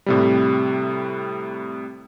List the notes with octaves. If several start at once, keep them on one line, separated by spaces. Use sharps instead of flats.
A2 C3 G3